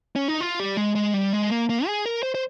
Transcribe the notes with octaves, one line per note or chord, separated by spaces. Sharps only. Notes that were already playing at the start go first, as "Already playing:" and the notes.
C#4
D#4
F4
G3
G#3
G#3
G3
G#3
A#3
A#3
G#4
A#4
C5
C5